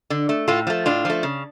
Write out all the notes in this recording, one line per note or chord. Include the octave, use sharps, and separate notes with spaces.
D3
A3
A2 F4 A4
F3 A3
A2 D4 F4
F3 A3
C#3